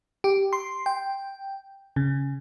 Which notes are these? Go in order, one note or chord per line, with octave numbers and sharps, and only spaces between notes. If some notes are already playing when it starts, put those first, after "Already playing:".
G4
C6
G5
C#3